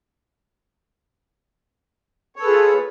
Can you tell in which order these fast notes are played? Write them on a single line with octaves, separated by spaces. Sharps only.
C#5 A4 B4 G#4 F4